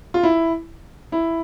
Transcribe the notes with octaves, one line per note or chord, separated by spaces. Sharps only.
F4
E4
E4